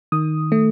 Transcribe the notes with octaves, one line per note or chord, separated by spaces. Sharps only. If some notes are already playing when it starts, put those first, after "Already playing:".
D#3 D#6
A3